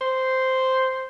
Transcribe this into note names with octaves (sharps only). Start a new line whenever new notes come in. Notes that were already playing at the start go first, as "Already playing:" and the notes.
C5